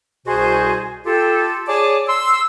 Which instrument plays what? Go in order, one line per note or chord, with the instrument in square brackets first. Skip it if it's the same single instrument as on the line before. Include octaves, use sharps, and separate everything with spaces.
[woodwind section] C2 B2 F#4 G#4 C5
F4 G4 A4
G#4 C#5 D5 G#5 A5 D6
C6 E6